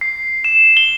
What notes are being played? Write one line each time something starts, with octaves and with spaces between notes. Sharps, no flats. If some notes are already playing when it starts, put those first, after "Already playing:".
C7
E7
G7